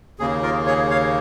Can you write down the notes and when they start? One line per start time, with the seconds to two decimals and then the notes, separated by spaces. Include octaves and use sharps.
0.19 D#2 C#3 A#3 G#4
0.43 F4 A#4
0.66 G#4 C#5
0.90 C#5 F5